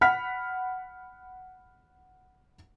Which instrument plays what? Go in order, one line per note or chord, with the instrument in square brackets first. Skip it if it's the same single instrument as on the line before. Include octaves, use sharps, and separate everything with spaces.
[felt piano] F#5 B5 F6 B6